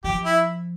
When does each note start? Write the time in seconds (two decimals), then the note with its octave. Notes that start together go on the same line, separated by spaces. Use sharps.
0.04 F3 G4
0.24 E4